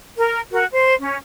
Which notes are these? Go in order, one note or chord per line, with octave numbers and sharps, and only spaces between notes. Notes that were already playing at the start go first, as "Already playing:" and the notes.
A#4
F#4 A#4
C5
C#4